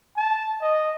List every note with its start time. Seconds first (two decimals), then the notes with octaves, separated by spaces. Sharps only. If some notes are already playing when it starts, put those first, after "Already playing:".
0.17 A5
0.62 D#5